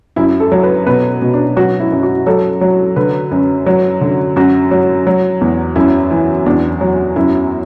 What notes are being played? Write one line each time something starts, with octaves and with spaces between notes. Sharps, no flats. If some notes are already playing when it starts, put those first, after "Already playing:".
F#2 E4
A4
F#3
B4
B2 B4
B2
D4
F#3 F#4
E4
F#2
F#4
F#3 A4
F#3
D3 B4
F#2
F#3
D3
F#2 F#4
F#3
F#3
E2
F#2 E4
E3
E2 D4
F#3
F#2 E4